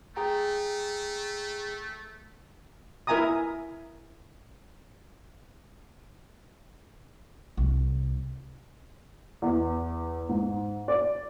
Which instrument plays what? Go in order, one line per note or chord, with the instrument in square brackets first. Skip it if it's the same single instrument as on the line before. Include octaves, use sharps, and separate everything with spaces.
[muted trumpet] A3 [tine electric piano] G#4 G5 A#5
[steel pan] E4 A#4 E5 G#5 A#5 D#6
[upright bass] C2
[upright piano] E2
G#2
D5